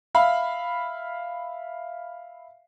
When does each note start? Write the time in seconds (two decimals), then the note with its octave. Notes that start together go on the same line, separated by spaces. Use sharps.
0.15 E5 F5 B5